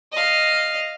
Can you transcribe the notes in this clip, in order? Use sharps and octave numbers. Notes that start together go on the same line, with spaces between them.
D#5 F5